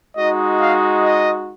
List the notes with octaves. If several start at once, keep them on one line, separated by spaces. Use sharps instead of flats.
G#3 D#4 F#4 D#5
F5
D#5